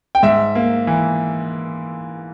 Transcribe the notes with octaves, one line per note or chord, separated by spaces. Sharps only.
G5
G#2 E5
A#3
E3